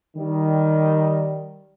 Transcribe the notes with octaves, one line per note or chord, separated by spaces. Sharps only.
D#3 G3